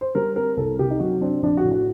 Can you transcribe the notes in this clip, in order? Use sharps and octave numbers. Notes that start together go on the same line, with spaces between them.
C5
G3 A#4
C4 A#4
C2 A4
C3 G4
D#4
F#3 F#4
C4 D4
A#1 D4
F#4
A2
F#4